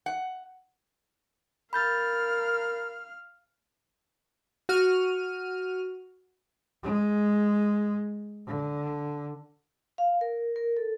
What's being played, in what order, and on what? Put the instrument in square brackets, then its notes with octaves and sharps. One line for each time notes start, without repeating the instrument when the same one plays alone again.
[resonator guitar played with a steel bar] F#5
[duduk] A#4 [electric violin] F5 F6 [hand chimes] B5 G6 A6
[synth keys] F#4 F6 D#7
[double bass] G#3
D3
[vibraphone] F5
A#4
A#4
A4